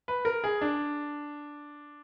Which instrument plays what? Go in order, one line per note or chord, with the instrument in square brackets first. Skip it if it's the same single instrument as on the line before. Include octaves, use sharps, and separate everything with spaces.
[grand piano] B4
A#4
G#4
D4